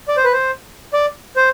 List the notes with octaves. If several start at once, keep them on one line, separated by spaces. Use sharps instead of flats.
D5
C5
B4
C5
D5
C5